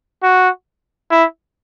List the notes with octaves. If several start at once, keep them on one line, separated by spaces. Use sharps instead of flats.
F#4
E4